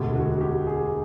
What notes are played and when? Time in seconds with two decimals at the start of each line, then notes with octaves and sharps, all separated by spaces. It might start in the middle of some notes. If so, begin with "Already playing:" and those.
Already playing: E1 D2 D3 G4
0.15 F#4
0.31 F#4
0.41 G4
0.67 G#4